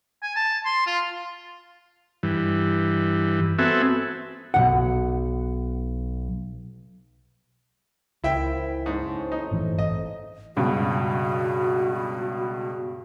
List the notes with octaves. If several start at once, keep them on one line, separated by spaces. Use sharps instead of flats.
G#5
A5
C6
F4
G2 E3
B3 C4 F#4 A4 E5 G#5
B1 G#2 F#5
C#2 D#3 E3 E4 C5 E5 G5
G#2 C#4 A4 C5
D#4 C5
G1 A2 E3
G#1 D#5
C#2 G2 B2 F#4